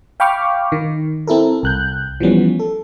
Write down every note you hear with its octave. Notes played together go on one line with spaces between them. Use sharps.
F5 G5 B5 C#6 D6 F6
D#3
C4 E4 A4 A#4
C2 F#6 G6
E3 F3 G3 B3 C#4
A4